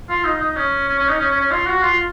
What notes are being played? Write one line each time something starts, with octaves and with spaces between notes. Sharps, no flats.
F4
D#4
D#4
C#4
C#4
C#4
D#4
C#4
C#4
C#4
F4
F#4
F4